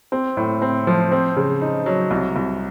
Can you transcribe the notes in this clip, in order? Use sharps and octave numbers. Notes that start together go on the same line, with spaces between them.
C4
A2
C4
F3
C4
C#3
D#4
F#3
C2
C2